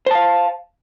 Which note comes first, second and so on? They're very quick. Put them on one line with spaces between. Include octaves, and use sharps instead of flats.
C5 A5 F5